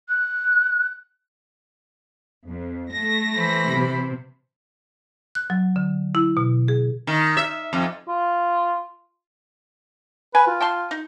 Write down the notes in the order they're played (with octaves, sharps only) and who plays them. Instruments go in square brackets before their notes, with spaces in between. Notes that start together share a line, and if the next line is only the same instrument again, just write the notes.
[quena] F#6
[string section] F2
A3 A#6
[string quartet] E3 C5 B5
[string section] C3
[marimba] F#6
F#3
D3
E4
B2
G#4
[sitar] D#3
E5
F2
[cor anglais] F4
[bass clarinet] B4 [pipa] G#5
[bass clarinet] F4
[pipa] G5 A5 C6
D#4